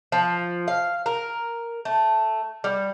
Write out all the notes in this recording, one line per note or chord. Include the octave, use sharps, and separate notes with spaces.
F3
F5
A#4
A3
G3